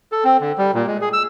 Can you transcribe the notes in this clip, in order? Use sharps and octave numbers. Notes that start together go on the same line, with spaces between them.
A4
C4
D3
G3
A#2
G#3
G#4
E6